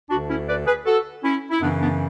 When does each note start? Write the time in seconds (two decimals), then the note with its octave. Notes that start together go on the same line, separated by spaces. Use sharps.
0.10 D2 D3 D4 F#4
0.29 C#4 E4
0.48 B4 D5
0.67 G#4 B4
0.86 F#4 A4
1.23 C#4 E4
1.50 E4
1.61 F#2 C#3 E3 B3 D4
1.81 B3 D4